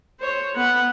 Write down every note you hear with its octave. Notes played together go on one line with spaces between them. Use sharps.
C5 C#5
B3 F#5